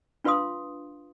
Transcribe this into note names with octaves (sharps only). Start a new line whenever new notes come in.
D4 F4 B4 F5 C6 D#6